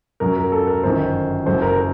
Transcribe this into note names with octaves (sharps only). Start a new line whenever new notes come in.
F#2 F#3 A#4
A#4
A4
A#4
G1 F#2 D#3 C5
C5
F#1 F#2 F#3 C5
A#4
A#4